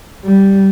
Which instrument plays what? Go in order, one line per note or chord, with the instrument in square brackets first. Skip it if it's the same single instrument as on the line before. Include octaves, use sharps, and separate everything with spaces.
[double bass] G3